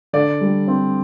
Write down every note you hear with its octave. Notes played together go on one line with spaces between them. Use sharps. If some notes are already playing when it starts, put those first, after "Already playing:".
D3 D5
G3
C4